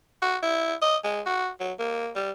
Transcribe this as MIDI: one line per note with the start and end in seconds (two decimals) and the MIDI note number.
0.22 0.37 66
0.42 0.74 64
0.82 0.96 75
1.04 1.21 56
1.26 1.49 66
1.60 1.72 54
1.79 2.10 58
2.15 2.31 55